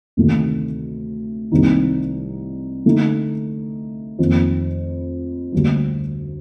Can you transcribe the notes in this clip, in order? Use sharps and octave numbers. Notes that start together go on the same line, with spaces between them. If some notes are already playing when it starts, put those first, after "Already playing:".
D2 C3 D#3 A3
C2 C3 D#3 A#3 D#4
D3 A3 D#4
F2 D#3 A#3
D2 D3 G3 A#3